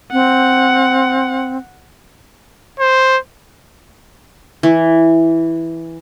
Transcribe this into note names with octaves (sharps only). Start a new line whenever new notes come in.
C4 F#5
C5
E3